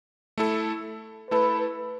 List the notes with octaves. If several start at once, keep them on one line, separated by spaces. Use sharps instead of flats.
A3 E4 A4
A3 E4 A4 B4